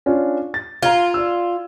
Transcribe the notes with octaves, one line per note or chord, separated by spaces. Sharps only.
C#4 D4 F4
A6
F4 A#5 G#6
D5 E6